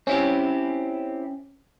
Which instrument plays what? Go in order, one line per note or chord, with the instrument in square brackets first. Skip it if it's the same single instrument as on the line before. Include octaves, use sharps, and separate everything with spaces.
[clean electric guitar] C4 E4 G4 [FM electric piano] C#4